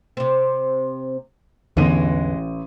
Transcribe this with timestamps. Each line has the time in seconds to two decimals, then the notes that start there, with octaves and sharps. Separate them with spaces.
0.17 C3 C4
1.77 A1 E2 D3 E3 G#3 B3 D#7